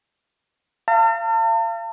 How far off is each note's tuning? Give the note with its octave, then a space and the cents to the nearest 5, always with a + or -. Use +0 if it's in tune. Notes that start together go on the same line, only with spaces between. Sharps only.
F5 -40 A5 +45